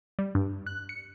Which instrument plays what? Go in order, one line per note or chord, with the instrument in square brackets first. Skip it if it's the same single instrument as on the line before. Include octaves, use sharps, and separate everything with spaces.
[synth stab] G3
G2
F#6
C#7